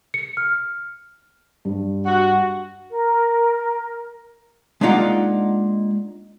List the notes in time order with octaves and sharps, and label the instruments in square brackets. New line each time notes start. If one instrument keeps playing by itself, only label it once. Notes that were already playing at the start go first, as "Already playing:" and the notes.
[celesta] C#7
F6
[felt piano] G2
[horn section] F#4
[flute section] A#4
[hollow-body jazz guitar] G#3 A#3 D4 D#4 F4 F#5